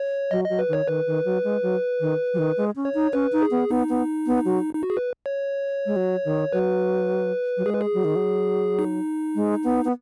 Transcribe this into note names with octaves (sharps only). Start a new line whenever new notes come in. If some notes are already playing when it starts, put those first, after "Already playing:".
Already playing: C#5
F#3 D#5
F#3 D#5
B4
D#3 C#5
D#3 B4
D#3
F#3
G#3
F#3
D#3
F#3
D#3
G#3
C#4
C#5
D#4
C#4 B4
D#4
G#4
B3
B3 D#4
B3
B3
F#3
D#4
F#4
G#4
B4
C#5
G#3
F#3
D#3
F#3 B4
F#3
G#3 G#4
B4
G#4
F#3
D#3
F#3
D#4
G#3
B3
B3